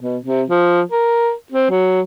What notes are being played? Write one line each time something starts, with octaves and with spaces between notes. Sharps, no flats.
B2
C3
F3
A#4
C4
F#3